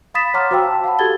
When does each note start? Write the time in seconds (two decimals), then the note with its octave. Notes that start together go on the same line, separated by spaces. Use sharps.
0.14 F5 B5 D#6 A6 B6 E7
0.34 C#5 F#5 A#5 C6 D6 F6
0.51 F#4 C5 F5 G5 E6
0.63 A5
0.84 F5 F#5 A5 B5
0.99 F#4 G4 A4 G#6 A6 G7